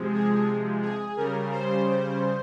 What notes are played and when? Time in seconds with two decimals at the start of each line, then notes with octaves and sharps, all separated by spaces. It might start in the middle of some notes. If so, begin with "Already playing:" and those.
Already playing: C3 F3 G#3
0.13 G#4
0.82 G#4
1.17 C#3 G3 A#4
1.51 C5
1.85 C5